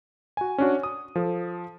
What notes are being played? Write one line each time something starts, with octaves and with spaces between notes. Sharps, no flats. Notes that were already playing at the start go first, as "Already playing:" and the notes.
F#4 G#5
C#4 D4 F#4
D#6
F3 A4